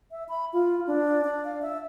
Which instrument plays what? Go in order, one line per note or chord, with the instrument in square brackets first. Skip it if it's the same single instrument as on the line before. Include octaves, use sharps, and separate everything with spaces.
[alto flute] E5
B5
F4
D4
D5
F5
E5